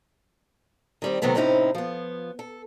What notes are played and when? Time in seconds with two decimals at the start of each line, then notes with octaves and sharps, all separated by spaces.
1.02 D#3 G3 C4
1.22 C3 D#3 F#3 A3 B3 C4
1.35 A2 C3 C4 C#4 D#4 E4
1.75 F3 B3
2.39 A4